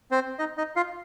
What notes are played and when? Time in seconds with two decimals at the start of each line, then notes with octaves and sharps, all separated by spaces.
0.11 C4 C5
0.39 D#4 D#5
0.57 D#4 D#5
0.76 F4 F5